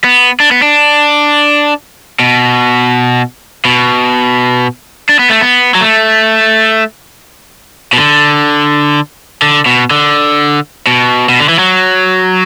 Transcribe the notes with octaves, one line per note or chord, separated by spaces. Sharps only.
B3
D4
B3
D4
B2
B2
D4
B3
A3
B3
F#3
A3
B2
D3
D3
B2
D3
B2
B2
D3
E3
F#3